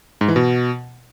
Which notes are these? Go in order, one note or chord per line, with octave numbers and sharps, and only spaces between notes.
G#2
E3
B2